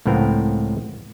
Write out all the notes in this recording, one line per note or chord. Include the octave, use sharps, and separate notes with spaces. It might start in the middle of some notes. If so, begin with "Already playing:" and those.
C#2 A2 F3 B3 C4 A#4